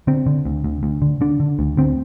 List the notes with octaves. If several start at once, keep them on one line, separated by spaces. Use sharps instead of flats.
D3 C4
D3
D2
D2
D2
D3
D3 D4
D3
D2
D2 C4